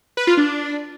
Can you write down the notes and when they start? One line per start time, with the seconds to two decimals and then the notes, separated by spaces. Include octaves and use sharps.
0.17 B4
0.27 F4
0.37 D4